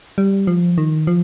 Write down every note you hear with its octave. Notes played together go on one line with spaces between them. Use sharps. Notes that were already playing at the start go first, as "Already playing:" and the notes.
G3
F3
D#3
F3